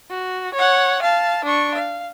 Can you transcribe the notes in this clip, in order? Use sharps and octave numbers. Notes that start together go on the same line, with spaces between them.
F#4
C#5 F#5
F5 A5
D4 C#6
F5